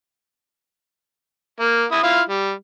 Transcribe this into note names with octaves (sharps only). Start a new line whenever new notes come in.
A#3
E4 D#6
E4 F4 F5
G3